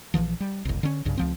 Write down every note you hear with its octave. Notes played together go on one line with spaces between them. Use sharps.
A#1 C#3 E3 F3
G3
F#1 C2
D3 C#4
B1 G2 C#3
C#2 F3 C4